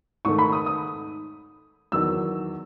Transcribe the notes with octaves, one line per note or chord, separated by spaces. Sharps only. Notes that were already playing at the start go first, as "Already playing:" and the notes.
G#2 D#3 A3 C#6
B5
D#6
D#6
E2 D#3 F#3 E6